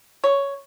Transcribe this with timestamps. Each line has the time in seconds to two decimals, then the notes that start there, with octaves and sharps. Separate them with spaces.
0.24 C#5